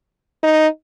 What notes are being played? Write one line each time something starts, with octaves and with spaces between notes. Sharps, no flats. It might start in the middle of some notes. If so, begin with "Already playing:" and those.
D#4